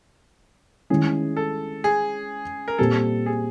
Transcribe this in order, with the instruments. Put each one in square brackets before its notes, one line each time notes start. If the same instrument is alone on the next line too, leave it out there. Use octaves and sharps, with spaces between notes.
[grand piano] D#3 G#3 C#4 E4 [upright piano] G#4
[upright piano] A4
G#4
A#4
[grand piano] A#2 G3 C4 [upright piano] A4
[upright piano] G#4